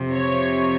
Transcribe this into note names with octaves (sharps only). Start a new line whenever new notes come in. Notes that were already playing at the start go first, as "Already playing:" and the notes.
Already playing: F2 C3 F3
C#5